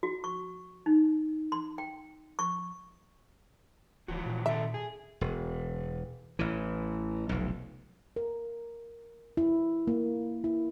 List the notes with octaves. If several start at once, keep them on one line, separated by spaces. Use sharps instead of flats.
F#4
C#6
D#4
C6
G5
C#6
D1 E3 F3 F#4
A#2
D#3 A4 E5
G#4
E1
A1 E3
F1 B1
A#4
E4
A#3
E4